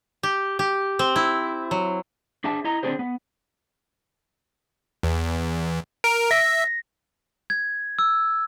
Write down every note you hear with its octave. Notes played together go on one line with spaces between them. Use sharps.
G4
G4
C4
E4
F#3
D4 G#4 E5 A5
E4 D#5 A#5
D3 C4 D4 F#4 G#4 C5
B3
E2
A#4 D7
E5 A#6 B6
G#6
E6